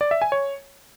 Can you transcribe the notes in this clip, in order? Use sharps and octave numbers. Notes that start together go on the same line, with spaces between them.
D5
E5
G#5
C#5